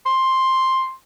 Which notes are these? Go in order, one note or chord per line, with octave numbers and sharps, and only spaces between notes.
C6